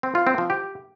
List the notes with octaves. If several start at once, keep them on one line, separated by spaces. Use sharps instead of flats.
C4
F4
C4
F3
G4